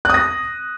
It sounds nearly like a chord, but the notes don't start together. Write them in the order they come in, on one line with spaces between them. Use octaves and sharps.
F#6 D#6 A#6